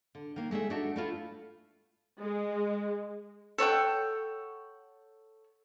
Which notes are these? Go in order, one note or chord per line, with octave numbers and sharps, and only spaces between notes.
D3
D#3 A#3
G#3 A3 G#4 E5
A3 D4 D#4 F#4
A3 E4 F4
G#3
A4 C#5 F#5 G5